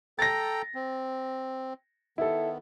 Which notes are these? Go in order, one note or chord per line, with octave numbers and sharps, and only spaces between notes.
A4 G5 A#5 A6 A#6
C4
D#3 B3 E4 A4